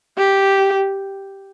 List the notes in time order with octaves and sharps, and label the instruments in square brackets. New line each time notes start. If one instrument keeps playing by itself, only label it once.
[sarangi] G4